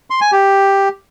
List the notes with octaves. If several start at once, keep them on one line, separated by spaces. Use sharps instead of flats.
C6
G#5
G4